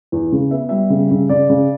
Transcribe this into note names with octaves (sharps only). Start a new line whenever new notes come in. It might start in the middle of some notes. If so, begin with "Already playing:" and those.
E2
C#3
B3 E5
G3 E5
C#3
C#3
C#3 D5
C#3